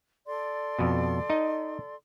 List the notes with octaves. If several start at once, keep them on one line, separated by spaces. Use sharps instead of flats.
A4 D5 C6
F2 B2
D#4 D#5